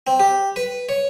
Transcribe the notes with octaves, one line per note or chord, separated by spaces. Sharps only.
C4
G4
B4
C#5